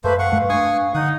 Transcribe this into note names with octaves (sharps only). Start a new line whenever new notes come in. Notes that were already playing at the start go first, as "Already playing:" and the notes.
F#2 A3 A#3 B4 C5
F5 F#5 C#6
G2 G#3 A3
D4 G#5 C#6 D#6
D3 D#4 F#5 D#6